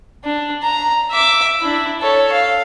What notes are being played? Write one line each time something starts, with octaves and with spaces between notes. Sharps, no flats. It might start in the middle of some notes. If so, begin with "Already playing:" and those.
D4
A#5
E5 D6
D4 E4
A4 C#5
F5